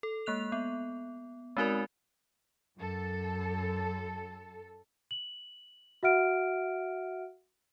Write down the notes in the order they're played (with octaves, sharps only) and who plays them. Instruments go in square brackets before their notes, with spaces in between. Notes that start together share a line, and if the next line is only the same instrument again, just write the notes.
[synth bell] A4
G#3 A#3 F#6 F7
B3
G#3 C4 D#4 F#4 A#4 D5
[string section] F#2 A4
[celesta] F#7
F#4 E5 F#5 F6 D7